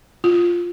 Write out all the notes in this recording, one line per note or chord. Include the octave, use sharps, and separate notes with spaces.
F4